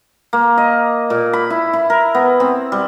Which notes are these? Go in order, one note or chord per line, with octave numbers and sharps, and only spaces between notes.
A#3
D#5
A#2
B5
E4
E4
A#4
B3
C4
G3